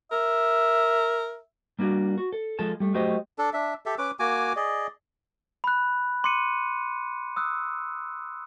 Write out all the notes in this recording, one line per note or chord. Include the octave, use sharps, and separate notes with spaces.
A#4 E5
G3 A#3 D4 F#4
F#4
A4
F3 G#3 A4 A5
G3 A3
F#3 A3 G4 C5 D#5
D4 A4
D4 E5
G4 A4 E5
C#4 B4 D6
A#3 F#4 G#5 D6
G#4 D5 D#5
B5 F#6
C6 D6 C#7 D#7
D#6 E6 F#6